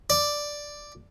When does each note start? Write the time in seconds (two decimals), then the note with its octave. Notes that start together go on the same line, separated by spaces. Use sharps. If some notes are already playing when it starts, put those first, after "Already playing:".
0.10 D5